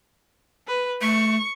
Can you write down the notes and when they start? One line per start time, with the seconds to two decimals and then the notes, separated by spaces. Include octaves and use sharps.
0.68 B4
1.01 A3 C#6